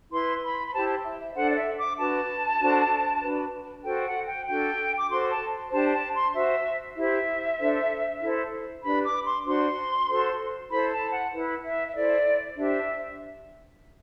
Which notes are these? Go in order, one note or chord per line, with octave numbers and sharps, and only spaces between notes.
E4 B4 C6
B5
B5
E4 G4 C5 A5
E5
E5
D4 A4 C5 F#5
D5
E5
D6
D4 F#4 B4 A5
D4 F#4 A4 C5
D4 F#4 B4
F#4 A4 C5 G5
F#5
G5
D4 F#4 A4 G5
D6
F#4 A4 C5 C6
A5
D4 G4 C5 A5
A5
C6
F#4 C5 E5
E4 G4 C5 E5
D4 A4 C5
E4 A4 C5
D4 G4 B4 B5
D6
C6
D4 F#4 C5 C6
F#4 A4 C5
E4 A4 C5 B5
A5
F#5
E4 B4
E5
E5
E4 A4 C5 D5
D4 G4 C5 E5